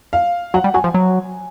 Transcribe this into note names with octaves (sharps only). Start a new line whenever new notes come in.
F5
F#3 F#5
G3
F#3 G#5
F3
F#3